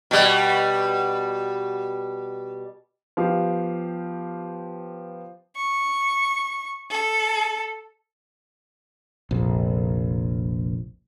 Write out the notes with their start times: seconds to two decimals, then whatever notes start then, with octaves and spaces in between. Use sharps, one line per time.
0.11 B2 G3
3.17 F3 B3 G4 F5
5.56 C#6
6.91 A4
9.31 F1 A#1